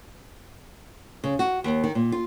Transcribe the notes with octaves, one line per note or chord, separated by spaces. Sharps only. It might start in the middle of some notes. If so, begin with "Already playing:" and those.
C#3
F#4
D#2
D#3
A#2
F4